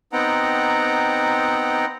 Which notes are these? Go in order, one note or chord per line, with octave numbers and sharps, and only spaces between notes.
B3 C4 D#4 F#5 G5 A#5